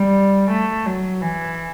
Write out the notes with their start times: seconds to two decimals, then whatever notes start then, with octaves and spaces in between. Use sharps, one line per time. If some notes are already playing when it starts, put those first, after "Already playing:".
Already playing: G3
0.50 A3
0.86 F#3
1.21 E3